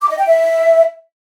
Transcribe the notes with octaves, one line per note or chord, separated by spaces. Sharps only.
D6
D#5
G5
E5